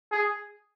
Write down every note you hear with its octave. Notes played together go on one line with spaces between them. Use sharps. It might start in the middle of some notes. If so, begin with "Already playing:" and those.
G#4